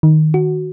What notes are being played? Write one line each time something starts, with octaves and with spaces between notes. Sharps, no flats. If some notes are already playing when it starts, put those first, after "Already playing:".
D#3
F#4